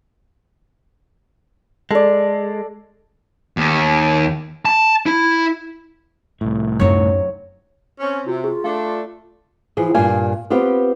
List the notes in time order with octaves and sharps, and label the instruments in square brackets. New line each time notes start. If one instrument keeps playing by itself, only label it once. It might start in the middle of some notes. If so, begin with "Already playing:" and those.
[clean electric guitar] G#3 [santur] A4 D5
[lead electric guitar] D#2
A5
E4
[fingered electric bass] C2 A2
[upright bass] F#2 D#4 [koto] C3 F#3 C#5
[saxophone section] C4 C#4
[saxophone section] C3 [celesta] F4 F#4
[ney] F4 [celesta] G#4
[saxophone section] A3 D4 [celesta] F5
[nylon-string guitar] E3 F3 G#4
G2 A#2 A#3 F4 G#5
B3 C4 F4 G4 B4